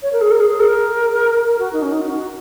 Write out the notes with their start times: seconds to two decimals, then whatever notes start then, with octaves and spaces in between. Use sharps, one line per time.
0.02 C#5
0.12 A#4
0.21 G#4
0.31 A#4
0.40 G#4
0.60 A#4
1.44 A#4
1.59 F#4
1.73 D#4
1.82 C#4
1.92 D#4
2.01 F#4